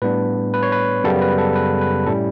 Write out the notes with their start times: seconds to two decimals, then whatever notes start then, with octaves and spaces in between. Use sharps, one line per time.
0.02 A2 G3 B3 D4 B4
0.54 B4
0.63 C#5
0.72 B4
1.04 F#2 C#3 G3 B3 A4
1.22 B4
1.38 A4
1.56 B4
1.81 B4
2.06 A2 G3 C#4 E4 A4